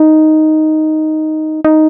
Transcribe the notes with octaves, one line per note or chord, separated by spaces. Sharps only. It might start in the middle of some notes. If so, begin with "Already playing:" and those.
Already playing: D#4
D#4